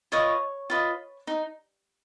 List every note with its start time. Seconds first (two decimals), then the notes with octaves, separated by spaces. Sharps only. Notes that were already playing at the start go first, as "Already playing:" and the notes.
0.12 F4 B4 C#5 D#5 C#6
0.70 F4 B4 D#5
1.27 D#4